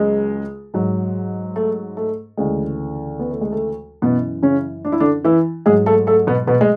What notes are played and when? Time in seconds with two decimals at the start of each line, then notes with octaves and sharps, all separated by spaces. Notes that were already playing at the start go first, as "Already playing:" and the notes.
Already playing: C#2 C#3 F#3 G#3
0.74 G#2 F#3
1.56 A3
1.97 A3
2.37 D2 C#3 E3 G#3
3.19 B3
3.31 A3
3.41 G#3
3.52 A3
4.02 F#2 B2 E3 B3
4.43 C#3 C#4
4.85 D4
4.92 E4
5.00 D3 D4
5.25 E3 E4
5.66 G#2 F#3 G#3 G#4
5.86 A3 A4
6.07 A3 A4
6.27 B2 B3
6.47 B2 B3
6.61 G#3